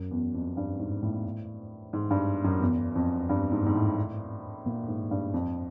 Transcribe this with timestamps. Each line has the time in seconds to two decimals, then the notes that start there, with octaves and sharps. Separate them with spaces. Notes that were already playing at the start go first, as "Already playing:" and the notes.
Already playing: F#2
0.11 E2
0.35 F2
0.57 G2
0.79 G#2
1.02 A2
1.93 G#2
2.11 G2
2.44 F#2
2.61 E2
2.95 F2
3.29 G2
3.52 G#2
3.66 G#2
3.74 A2
4.66 A#2
4.88 G#2
5.11 G2
5.34 F2